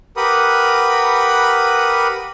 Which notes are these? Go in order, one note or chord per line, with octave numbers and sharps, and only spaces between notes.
G4 A#4 B4 F#5 B5 D#6